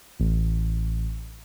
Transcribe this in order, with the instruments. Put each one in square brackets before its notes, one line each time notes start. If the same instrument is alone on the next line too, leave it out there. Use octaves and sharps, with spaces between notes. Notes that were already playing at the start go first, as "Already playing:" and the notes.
[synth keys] A1